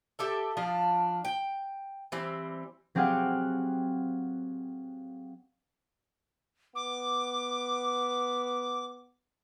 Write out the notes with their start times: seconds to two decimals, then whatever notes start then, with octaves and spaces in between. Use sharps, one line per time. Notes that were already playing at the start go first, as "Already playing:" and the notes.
0.19 G4 A4 E5
0.57 F3 D4 F4
1.25 G5
2.12 E3 G3 C4
2.95 F#3 C4 G4 G#4 F5 F#5
6.75 B3 D6